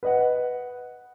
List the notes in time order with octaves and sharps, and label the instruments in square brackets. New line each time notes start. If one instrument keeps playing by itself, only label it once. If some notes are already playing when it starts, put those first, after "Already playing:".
[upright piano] B4 D#5 F#5